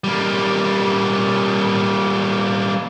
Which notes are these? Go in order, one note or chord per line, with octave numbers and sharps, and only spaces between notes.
G3 A#3